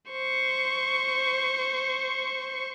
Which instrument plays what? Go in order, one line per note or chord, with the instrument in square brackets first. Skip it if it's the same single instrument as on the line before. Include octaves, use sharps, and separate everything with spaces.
[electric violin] C5 C#6